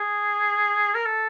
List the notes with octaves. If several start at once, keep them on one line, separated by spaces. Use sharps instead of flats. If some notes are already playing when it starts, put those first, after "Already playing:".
Already playing: G#4
A#4
A4